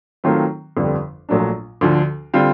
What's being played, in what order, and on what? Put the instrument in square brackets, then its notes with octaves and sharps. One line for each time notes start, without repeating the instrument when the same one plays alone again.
[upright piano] D#3 F#3 A3 C4 F4
G1 F2 D3 G3
A#1 A#2 F#3 A3 D4
D2 D3 F3
D3 G3 C4 F4